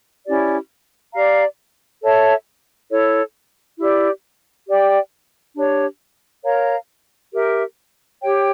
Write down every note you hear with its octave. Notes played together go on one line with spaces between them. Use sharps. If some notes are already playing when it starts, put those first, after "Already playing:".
C#4 E4 G4 D5
G4 D5 F5 A#5
A4 C#5 E5 A5
E4 A4 C#5
E4 G4 D5
G4 D5 G5
D4 G4 C#5
A#4 C#5 F5 A#5
G4 A#4 E5
G4 C#5 G5